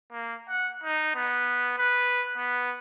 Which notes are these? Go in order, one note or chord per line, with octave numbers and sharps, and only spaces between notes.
A#3
F#5
D#4
B3
B4
B3